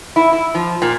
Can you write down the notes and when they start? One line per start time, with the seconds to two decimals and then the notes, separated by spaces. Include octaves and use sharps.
0.16 E4
0.32 E4
0.54 F3
0.82 A#2